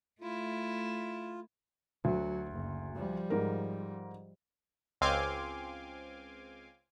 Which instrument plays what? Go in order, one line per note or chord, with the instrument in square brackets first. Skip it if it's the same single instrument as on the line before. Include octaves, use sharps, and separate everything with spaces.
[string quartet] A3 E4 [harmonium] F4
[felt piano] D2 [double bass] F#3
[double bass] F#1
F3 G3
[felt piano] G#2 A#4
[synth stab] C#2 C4 F5 G#5 C6 D6